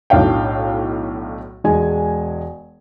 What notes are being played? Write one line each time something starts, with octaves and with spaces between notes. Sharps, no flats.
B1 A2 D4 F5 G5
E1 G#3 G#5